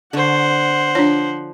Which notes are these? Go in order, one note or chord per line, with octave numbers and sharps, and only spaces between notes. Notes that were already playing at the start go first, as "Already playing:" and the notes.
D3 D4 C5 F#5 C#6
F3 D4 C#5